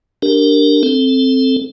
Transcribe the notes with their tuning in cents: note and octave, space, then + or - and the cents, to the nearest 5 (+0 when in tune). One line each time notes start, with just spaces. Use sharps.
D4 +0 G4 +0 A#4 -10
C4 +0 A4 +0